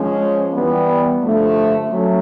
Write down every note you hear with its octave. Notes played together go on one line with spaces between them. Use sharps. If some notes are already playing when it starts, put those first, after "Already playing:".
Already playing: F3 G#3 C#4
E3 G3 B3
G2 D3 F3 A3
F#3 A3 C#4